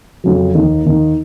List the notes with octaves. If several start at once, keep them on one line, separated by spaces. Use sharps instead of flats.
F2 C#3 F#3
D#2 D#3 A#3 D#4
D#2 D#3 A#3 D#4